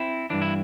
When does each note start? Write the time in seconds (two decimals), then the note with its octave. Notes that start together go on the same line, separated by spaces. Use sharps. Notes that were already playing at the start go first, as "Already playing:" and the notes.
Already playing: C4 E4
0.30 G2 E3 D4
0.42 E4